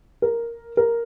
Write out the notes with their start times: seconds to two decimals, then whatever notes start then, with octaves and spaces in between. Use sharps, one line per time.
0.22 A#4
0.77 A#4